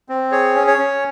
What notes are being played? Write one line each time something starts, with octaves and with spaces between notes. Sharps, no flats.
C4
G#4 C#5
C#4
C#5
C#4